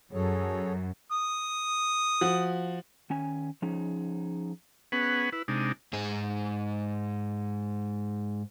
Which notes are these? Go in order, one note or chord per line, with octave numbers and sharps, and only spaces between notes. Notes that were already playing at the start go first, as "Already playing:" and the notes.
F#2 G#4 A4 C#5
D#6
F3 F#4
D#3 C#4 G#5
F3 C#4 D#4 G#4
B3 C#4 G#4 B4 F#5
E4 B4
C3 G#3 D4 D#4
G#2 G#4